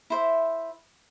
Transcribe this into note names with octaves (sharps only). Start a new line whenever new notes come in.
E4 C5 E5